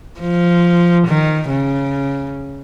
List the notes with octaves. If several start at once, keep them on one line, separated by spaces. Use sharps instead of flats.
F3
D#3
C#3